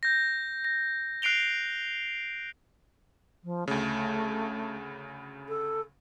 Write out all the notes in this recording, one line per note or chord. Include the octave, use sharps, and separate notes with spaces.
G6 A#6
A#6
F#6 C7 D7 F7 G7
F3
D2 C#3 A3
A4